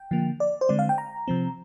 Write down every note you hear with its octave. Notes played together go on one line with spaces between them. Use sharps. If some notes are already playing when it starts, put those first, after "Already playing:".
Already playing: G5
D3 F3 A#3
D5
C5
D3 G#3 C4 D5
F5
G5
A#5
C3 F3 C4